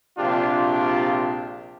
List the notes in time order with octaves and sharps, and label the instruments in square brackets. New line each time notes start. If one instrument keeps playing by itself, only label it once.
[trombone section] A#1 C3 D4 F4 G4